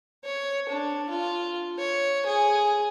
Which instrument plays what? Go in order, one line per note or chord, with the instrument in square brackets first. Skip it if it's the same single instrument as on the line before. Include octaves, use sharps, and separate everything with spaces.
[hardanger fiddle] C#5
D4
F4
C#5
G#4